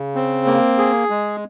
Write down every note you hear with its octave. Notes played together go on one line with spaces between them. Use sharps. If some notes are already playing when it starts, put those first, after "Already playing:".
Already playing: C#3
C4
A#3
G#4
G#3